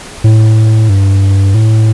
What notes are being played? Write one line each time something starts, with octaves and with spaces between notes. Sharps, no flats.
A2
G2
A2